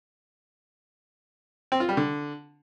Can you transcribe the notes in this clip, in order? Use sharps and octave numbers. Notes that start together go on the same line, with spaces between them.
C4
F4
G3
D3